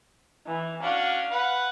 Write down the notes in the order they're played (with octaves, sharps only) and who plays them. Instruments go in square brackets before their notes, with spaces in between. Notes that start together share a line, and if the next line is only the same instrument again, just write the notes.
[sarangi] E3
[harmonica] C#4 D4 F#4 [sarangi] F5
[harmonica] B4 F#5